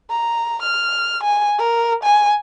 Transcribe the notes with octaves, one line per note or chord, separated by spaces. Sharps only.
A#5
F6
G#5
A#4
G#5